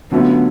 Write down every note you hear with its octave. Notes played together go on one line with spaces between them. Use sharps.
D3 F#3 A3 B3 C#4 F4